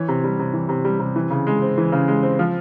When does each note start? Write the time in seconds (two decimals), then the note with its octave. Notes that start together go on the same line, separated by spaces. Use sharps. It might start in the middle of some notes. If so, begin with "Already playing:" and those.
Already playing: E3 C#5
0.08 C3
0.24 G3
0.39 C3
0.53 E3
0.69 C3
0.85 G3
1.00 C3
1.16 E3
1.30 C#3
1.47 G#3
1.62 C4
1.78 E3
1.92 C#3
2.08 G#3
2.23 C4
2.39 F3